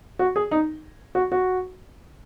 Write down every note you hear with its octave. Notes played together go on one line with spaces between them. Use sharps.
F#4
G#4
D#4
F#4
F#4